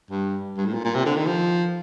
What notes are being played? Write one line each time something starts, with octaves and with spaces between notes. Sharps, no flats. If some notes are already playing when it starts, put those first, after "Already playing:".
G2
G2
A2
A#2
A#2
C3
D3
D#3
F3